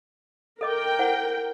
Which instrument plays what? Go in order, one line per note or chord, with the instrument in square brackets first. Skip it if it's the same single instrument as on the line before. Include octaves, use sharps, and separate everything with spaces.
[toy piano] A4 D#5 D6 [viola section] A#4 G5
[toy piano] E4 C5 F#5